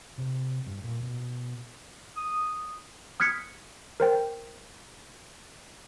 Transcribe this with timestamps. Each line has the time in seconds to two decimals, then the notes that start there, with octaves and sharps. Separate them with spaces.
0.18 C3
0.66 G2
0.83 A#2
1.03 B2
2.17 D#6
3.20 D#6 F6 F#6 G#6 B6 C#7
4.00 A#4 C5 G5